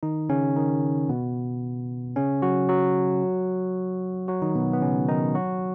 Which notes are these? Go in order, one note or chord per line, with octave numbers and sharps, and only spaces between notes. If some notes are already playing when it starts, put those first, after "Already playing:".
D#3 D#4
C#3 C#4
D#3 D#4
B2 B3
C#3 C#4
F#3 F#4
F#3 F#4
F#3 F#4
D#3 D#4
B2 B3
B3
C#3 C#4
D#3 D#4
F#3 F#4